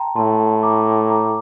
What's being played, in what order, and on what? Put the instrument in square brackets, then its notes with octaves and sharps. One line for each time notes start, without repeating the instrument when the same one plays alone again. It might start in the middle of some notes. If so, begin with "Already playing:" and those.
Already playing: [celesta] G5 A5 A#5 C6
[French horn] A2 [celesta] A5 C6
[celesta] A#5 D6
A#5 D6